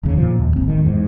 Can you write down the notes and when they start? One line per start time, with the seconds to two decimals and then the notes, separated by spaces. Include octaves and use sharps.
0.03 F1 D#2 C#3
0.18 A#2 C#3 F3
0.39 D#2
0.56 D1 G#1 D#2 C4
0.68 E1 D#3
0.84 E2 G#2